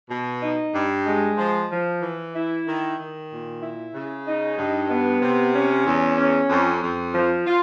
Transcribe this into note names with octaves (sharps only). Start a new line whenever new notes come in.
B2
D#4
G2
G#3
F3
F3
E3
E4
D#3
D#3
A#2
E4
C#3
D#4
G2
B3
C3
C#4
E2
C#4
F2
F2
F3
F4